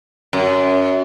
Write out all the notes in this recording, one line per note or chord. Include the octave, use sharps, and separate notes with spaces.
F#2